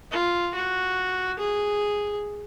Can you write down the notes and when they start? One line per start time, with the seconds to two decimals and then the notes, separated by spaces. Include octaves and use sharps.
0.12 F4
0.55 F#4
1.39 G#4